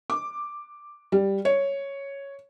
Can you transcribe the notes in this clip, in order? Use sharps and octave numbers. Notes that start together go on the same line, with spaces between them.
D6
G3
C#5